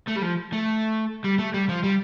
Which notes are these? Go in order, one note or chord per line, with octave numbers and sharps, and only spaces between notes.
A3
G3
F3
A3
G3
A3
G3
F3
G3